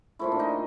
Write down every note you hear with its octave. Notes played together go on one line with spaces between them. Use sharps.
A#2 F3 A3 E4
D4
D#4